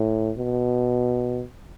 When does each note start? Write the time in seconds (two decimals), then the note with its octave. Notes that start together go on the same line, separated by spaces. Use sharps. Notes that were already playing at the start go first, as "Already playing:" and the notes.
Already playing: A2
0.37 B2